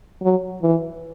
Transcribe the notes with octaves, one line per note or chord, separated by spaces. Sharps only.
F#3
E3